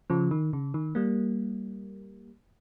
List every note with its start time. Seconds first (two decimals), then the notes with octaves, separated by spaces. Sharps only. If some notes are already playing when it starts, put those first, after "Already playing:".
0.10 C#3 F3
0.31 D#3
0.53 C#3
0.74 D#3
0.95 G3 A#3